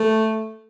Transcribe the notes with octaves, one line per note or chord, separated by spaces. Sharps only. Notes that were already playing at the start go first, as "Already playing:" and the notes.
Already playing: A3